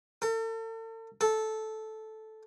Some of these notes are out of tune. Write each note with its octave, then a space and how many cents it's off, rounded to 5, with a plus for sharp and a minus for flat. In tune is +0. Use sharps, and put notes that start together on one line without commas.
A4 +40
A4 -10